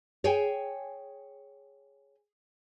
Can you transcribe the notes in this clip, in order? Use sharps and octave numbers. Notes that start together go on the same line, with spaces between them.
G#4 C#5 G5 G#5